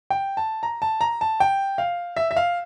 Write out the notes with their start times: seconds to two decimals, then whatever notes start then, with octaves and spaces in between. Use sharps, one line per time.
0.10 G5
0.37 A5
0.63 A#5
0.82 A5
1.01 A#5
1.21 A5
1.40 G5
1.78 F5
2.16 E5
2.31 E5
2.36 F5